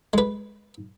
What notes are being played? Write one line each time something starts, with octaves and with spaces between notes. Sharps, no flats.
G#3 B4